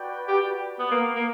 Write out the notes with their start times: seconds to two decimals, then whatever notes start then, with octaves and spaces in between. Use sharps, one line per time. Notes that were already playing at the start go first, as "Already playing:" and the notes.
Already playing: F#4 B4 D5 G5
0.28 G4
0.79 B3
0.91 A#3
1.15 A#3